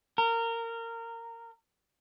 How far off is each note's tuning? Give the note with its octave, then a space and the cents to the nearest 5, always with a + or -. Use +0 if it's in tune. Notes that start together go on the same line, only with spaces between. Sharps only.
A#4 -20